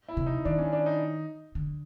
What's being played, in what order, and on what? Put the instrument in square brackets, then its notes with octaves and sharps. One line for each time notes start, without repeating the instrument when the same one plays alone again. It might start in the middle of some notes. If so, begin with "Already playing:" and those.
[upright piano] E4
[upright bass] C3
[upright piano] D#4
[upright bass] D#3 [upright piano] D4
[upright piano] C#4
D4
D#4
[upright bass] D3